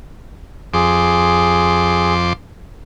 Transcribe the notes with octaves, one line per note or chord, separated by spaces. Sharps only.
F2 G#4 C6 D6